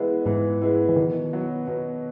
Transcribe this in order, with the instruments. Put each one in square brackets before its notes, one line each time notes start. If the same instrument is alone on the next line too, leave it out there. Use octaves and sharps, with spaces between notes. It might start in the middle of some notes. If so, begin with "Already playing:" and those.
Already playing: [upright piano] E3 G#3 B3 E4
[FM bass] G#2 [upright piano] E3
[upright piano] G#3 B3 E4
[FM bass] E3
[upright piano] B2 [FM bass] D#3
[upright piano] F#3 B3
B2